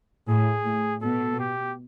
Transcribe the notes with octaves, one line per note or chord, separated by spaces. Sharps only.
A2 G#4
A2
B2 A4
G4